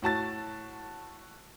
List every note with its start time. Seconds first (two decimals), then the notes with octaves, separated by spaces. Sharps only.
0.02 A2 F#4 A5 A6